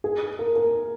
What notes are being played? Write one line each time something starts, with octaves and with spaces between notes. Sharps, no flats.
G#4
A#4
A#4